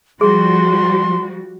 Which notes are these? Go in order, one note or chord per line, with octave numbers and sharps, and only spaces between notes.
F3 G3 F#4 G#4 C6